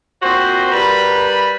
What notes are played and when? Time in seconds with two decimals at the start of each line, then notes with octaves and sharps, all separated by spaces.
0.23 A#2 C4 F#4 C5
0.72 G3 A#4 B4 B5